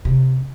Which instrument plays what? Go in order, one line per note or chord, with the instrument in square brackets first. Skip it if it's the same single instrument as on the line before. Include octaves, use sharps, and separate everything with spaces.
[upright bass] C3